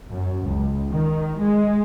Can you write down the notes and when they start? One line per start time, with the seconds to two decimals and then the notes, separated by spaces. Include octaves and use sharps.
0.11 F#2
0.47 C#2
0.92 D#3
1.39 G#3